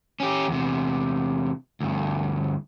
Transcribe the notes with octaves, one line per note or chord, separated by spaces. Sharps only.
C#4 G4
E2 C3
D2 G2